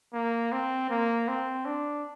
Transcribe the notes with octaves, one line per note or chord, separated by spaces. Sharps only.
A#3
C4
A#3
C4
D4